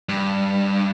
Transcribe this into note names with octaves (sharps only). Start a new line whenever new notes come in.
G2